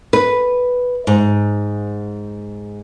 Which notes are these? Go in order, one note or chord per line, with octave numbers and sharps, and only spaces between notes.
B4
G#2